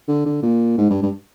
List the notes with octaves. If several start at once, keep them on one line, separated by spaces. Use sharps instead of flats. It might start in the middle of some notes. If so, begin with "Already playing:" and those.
D3
D3
A#2
G#2
G2
G2